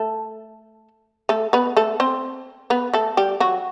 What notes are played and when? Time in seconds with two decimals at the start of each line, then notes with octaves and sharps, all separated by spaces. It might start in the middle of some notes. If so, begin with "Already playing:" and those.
Already playing: A3 A4
1.29 A3 A4
1.53 B3 B4
1.77 A3 A4
2.00 C4 C5
2.70 B3 B4
2.94 A3 A4
3.17 G3 G4
3.40 F#3 F#4